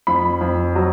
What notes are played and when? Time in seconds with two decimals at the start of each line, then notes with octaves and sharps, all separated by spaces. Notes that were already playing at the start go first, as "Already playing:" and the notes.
0.07 F2 B5
0.41 F2
0.75 F#3